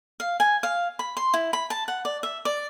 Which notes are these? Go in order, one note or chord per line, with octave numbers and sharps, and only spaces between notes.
F5
G#5
F5
B5
C6
E4
B5
A5
F#5
D5
E5
D5